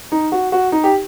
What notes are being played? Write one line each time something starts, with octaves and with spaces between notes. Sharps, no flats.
D#4
F#4
F#4
D#4
G4